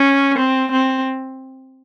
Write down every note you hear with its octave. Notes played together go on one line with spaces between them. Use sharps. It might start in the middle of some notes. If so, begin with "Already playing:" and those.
Already playing: C#4
C4
C4